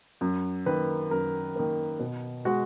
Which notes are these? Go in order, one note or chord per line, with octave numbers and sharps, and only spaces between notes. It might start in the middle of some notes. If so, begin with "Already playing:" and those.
F#2
D#3 A#3 B4
F#2 A#4
D#3 A#3
B2
G#3 F#4